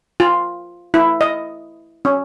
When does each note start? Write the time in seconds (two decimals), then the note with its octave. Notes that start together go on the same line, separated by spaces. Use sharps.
0.20 F4
0.94 E4
1.21 D#5
2.05 C#4